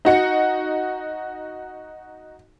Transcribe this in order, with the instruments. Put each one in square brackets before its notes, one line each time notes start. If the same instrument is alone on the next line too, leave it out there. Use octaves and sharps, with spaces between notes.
[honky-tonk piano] D#4 F#4 C#7